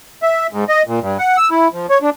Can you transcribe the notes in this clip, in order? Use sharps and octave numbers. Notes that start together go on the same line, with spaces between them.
E5
G#2
D#5
A#2
G2
F#5
E6
E4
F3
C#5
D4